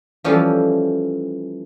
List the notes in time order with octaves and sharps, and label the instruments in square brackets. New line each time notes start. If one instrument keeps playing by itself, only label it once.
[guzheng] E3 F3 G3 C#4 A4